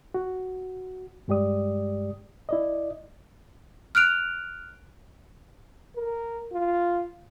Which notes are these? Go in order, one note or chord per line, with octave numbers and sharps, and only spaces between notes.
F#4
G2 G#3 G4 D5 D#6
E4 D5 D#5
F6 F#6 D7 F7
A#4
F4